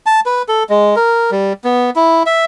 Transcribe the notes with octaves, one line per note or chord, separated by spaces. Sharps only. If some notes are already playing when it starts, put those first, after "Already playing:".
A5
B4
A4
G#3
A#4
G3
B3
E4
E5